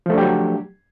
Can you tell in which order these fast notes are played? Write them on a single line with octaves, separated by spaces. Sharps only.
F3 A3 D4 G4 F#3